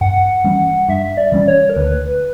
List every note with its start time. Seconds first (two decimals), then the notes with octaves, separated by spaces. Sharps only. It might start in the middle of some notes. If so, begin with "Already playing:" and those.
0.01 G2 F#5
0.44 E3 G3 C#4
0.89 G2 E5
1.17 D5
1.32 E3 G3 C#4
1.48 C#5
1.70 A#4
1.76 D2 B4